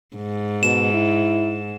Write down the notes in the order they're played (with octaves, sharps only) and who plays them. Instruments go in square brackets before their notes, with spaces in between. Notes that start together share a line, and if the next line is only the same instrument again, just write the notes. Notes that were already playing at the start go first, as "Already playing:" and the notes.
[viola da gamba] G#2
[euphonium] B2 [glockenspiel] E7
[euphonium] E4